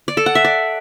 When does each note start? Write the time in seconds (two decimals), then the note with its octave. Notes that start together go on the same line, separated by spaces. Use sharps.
0.08 D5
0.17 A4
0.26 F#5
0.35 E5
0.45 D5